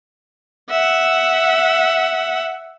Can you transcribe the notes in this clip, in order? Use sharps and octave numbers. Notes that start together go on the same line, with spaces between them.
E5 F#5